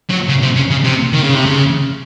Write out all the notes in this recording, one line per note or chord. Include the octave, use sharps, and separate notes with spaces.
F#3
C#3
C3
C#3
C#3
C3
D#3
C#3
C3
C#3